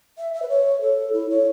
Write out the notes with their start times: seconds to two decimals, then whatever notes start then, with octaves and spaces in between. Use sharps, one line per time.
0.18 E5
0.34 E5
0.42 B4
0.49 C#5
0.81 A4
1.13 E4
1.30 C#5